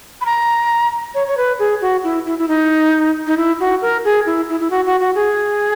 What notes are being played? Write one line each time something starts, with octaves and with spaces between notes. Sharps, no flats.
B5
A#5
C#5
C#5
B4
G#4
F#4
E4
E4
E4
D#4
D#4
E4
F#4
A#4
G#4
E4
E4
E4
F#4
F#4
F#4
G#4